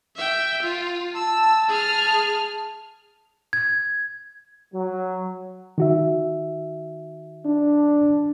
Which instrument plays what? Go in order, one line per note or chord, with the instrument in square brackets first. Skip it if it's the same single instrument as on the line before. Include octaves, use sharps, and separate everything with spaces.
[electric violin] E5 G5
F4
[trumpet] A5 [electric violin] E6
[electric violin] G#4 F6
[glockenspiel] G#6
[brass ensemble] F#3
[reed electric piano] D#3 F#4 E5
[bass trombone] D4